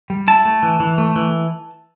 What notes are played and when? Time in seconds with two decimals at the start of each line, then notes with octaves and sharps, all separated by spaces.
0.10 G3
0.28 E4 A5
0.45 A3
0.63 E3
0.80 E3
0.98 A3
1.16 E3